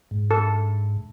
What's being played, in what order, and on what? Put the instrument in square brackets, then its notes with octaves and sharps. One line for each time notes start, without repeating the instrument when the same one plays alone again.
[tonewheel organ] G#2
[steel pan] A4